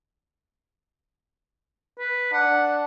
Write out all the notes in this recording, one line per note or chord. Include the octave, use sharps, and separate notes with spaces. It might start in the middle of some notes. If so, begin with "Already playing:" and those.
B4
D4 F#5